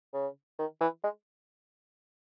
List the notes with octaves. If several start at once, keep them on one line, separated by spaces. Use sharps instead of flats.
C#3
D#3
E3
G#3